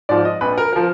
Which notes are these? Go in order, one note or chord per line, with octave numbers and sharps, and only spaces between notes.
G#2 F3 D5
D#5
A#1 B4
A#4
F3 A#4